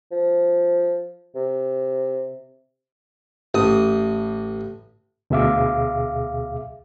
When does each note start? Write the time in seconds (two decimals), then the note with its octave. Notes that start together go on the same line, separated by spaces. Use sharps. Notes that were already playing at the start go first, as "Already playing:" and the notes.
0.12 F3
1.35 C3
3.54 A1 D#6
5.30 D2 B2 G#4 E5 F5 D6